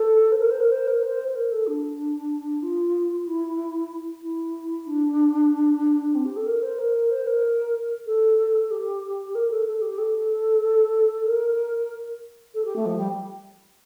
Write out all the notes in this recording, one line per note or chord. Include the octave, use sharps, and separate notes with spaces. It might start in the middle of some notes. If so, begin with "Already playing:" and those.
Already playing: A4
C5
A#4
C5
A#4
C5
A#4
C5
C5
A#4
A4
D4
F4
E4
E4
D4
C4
G4
A4
A#4
C5
A#4
C5
A#4
A4
G4
A#4
A4
A4
G4
A4
A#4
A4
G4
A3
F3
G3